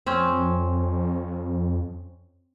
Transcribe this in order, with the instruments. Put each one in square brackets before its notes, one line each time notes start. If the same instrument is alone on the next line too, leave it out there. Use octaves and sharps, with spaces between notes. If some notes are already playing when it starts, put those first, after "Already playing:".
[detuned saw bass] F2 [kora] C4 C#4